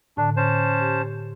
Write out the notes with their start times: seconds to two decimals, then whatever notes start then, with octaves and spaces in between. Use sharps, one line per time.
0.17 A2 D3 D4
0.37 C#4 C5 A5
0.80 G4